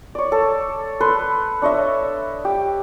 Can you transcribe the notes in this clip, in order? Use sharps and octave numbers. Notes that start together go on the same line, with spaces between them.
C#5 D5
A4
A4 B4 C6
D4 C#5 D#5 E5
G4